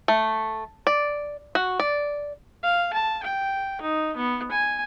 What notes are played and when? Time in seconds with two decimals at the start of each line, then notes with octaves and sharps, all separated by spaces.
0.08 A3
0.87 D5
1.55 F#4
1.79 D5
2.63 F5
2.93 A5
3.23 G5
3.81 D#4
4.16 B3
4.51 G#5